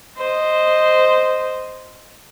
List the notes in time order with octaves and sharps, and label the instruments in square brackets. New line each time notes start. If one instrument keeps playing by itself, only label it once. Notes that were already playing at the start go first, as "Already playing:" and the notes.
[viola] C5 D#5